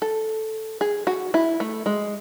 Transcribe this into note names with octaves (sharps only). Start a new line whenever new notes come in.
A4
G#4
F#4
E4
A3
G#3